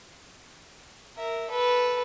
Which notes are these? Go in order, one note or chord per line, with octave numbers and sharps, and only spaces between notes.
A#4 E5
A4 B4